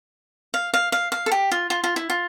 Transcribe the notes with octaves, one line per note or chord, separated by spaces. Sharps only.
F5
F5
F5
F5
A4
G4
F4
F4
F4
E4
F4